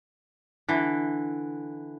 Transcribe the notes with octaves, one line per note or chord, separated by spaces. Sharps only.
D3 E3